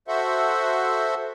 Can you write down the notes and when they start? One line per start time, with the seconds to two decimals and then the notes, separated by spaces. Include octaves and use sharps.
0.08 F#4 A4 C5 E5 F#5